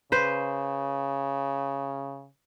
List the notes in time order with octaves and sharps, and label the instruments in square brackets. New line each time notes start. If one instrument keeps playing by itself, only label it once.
[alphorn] C#3 [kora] B4 C5